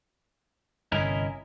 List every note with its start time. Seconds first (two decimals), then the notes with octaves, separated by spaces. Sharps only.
0.92 G1 G2 C3 C#4 E4 A#4 D#5